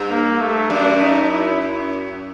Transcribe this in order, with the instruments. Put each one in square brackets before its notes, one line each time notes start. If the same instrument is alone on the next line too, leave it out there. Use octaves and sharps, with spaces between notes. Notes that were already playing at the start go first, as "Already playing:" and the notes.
Already playing: [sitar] G2
[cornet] A#3
A3
[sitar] F#2 [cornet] D4
[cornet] D#4
E4